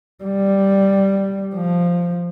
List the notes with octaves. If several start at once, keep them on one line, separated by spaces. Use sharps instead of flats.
G3
F3